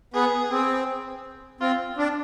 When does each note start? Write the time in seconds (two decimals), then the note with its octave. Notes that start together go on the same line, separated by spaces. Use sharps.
0.14 B3 G#4
0.51 C4
1.61 C4 F4
1.97 D4